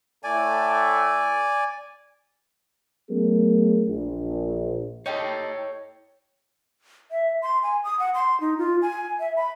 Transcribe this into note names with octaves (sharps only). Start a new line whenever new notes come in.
A2 A3 D5 G#5
F#3 A3 B3 C#4 G#4 A#4
A#1
D#4 G4 A4 C#5 G5
E5
C6
G#5
D#6
F#5
C6
D#4
F4
G#5
E5
B5